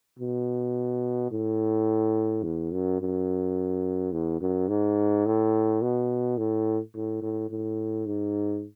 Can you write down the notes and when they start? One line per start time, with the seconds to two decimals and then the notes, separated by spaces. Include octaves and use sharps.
0.19 B2
1.31 A2
2.43 E2
2.72 F#2
3.01 F#2
4.12 E2
4.41 F#2
4.69 G#2
5.26 A2
5.82 B2
6.38 A2
6.95 A2
7.22 A2
7.50 A2
8.06 G#2